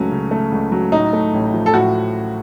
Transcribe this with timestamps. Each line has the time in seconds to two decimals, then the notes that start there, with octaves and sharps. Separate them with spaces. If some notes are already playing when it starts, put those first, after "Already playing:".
Already playing: C#2 C#3 F#3 A3 C#4
0.11 C#3
0.31 A3
0.52 C#2
0.72 F#3
0.92 A2 D#4
1.13 A3
1.34 A1
1.54 F3
1.66 A4
1.74 A2 F#4